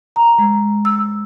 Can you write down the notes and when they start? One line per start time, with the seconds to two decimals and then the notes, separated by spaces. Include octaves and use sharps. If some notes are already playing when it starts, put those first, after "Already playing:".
0.16 A#5
0.39 G#3
0.85 E6